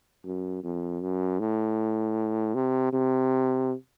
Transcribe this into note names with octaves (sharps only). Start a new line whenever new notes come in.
F#2
F2
F#2
A2
C3
C3